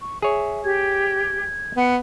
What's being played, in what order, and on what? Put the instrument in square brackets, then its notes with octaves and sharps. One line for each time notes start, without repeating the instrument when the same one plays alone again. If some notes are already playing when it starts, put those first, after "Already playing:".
[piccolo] C#6
[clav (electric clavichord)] G#4 C#5 [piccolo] E5
[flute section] G4 [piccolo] G#6
[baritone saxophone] B3 [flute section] F#5